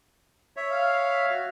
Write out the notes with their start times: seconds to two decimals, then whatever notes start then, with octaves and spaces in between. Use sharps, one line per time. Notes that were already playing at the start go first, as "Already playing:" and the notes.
0.56 C#5 E5
0.71 F5
1.30 F#4